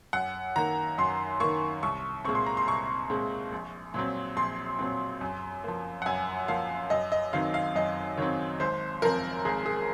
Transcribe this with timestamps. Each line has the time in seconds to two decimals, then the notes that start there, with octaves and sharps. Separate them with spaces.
0.13 F#2 F#5
0.56 D#3 A#3 A#5
0.98 F#2 C6
1.40 D#3 A#3 C#6
1.83 C2 C#6
2.24 A#2 G#3 C4 C#6
2.35 C6
2.46 A#5
2.57 C6
2.67 C2 C#6
3.10 A#2 G#3 C4
3.52 A#1
3.94 A#2 F#3 C4
4.37 A#1 C6
4.79 A#2 F#3 C4
5.21 F#2
5.64 F3 A#3
6.02 F#5
6.06 F#2 G#5
6.48 F3 A#3 F5
6.90 F#2 D#5
7.12 D#5
7.33 D#3 F#3 C4 F5
7.54 F5
7.75 F#2 D#5
8.17 D#3 F#3 C4 C#5
8.60 G#1 C5
9.02 F#2 F3 C4 A#4
9.45 G#1 G#4
9.66 G#4